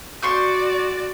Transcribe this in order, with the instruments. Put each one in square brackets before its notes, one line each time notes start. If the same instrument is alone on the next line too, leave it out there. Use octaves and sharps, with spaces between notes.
[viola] F#4 D5 [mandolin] C6 C#6 G6